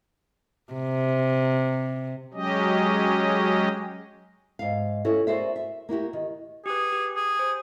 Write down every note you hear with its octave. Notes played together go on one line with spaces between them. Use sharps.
C3
F#3 G#3 C#4 G4 D#5
G#2 F5
C#4 E4 F#4 A4 C#5
F#4 G#4 A#4 C5 D5 E5
E5
A#3 E4 F#4 G4
D#3
G4 G#4 B4
G4
G#4
C5